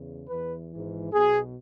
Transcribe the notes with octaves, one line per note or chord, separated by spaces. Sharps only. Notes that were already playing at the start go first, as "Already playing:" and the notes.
Already playing: E2 C#3
E2 E3 B4
G#1 G#2 E3
B1 B2 G#4